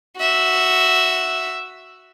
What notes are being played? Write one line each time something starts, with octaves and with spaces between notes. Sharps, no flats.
F#4 E5